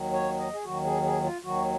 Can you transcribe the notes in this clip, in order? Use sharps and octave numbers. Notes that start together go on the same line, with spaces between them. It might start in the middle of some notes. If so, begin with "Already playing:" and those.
Already playing: D#2 D#3 F#3
C#5
D#5
G#4
D#2 D#3 F#3 F#4
G#4
G#4
F4
D#2 D#3 F#3 F#4